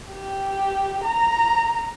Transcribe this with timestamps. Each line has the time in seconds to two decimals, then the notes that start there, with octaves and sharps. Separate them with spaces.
0.12 G4
1.04 A#5